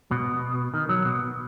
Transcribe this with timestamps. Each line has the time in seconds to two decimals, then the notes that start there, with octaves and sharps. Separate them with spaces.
0.11 B2
0.74 D#3
0.89 F#3
1.05 B2